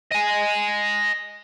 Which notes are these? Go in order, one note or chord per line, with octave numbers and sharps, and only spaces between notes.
D#5 G#5